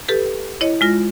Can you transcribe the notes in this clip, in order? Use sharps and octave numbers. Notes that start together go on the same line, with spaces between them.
G4 A4 B4
E4 C#5 D#5
G#3 F4 A#6